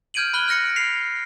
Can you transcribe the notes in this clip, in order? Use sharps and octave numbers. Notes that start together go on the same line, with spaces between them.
F6 G6 G#6 D7 D#7 F#7
B5 F6 F#6 F#7 G7
F6 F#6 A#6 C#7 D7
B6 C7 F7